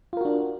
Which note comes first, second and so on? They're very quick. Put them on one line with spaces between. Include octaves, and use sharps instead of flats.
F4 A#4 F#4 D4